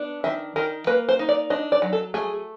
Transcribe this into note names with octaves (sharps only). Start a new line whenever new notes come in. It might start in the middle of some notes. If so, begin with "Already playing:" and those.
Already playing: B3 D4
D#3 E5
D#3 A#4
A#3 B4
C5
D#4
D5
D4 D#5
D5
F#3
A4
A3 G#4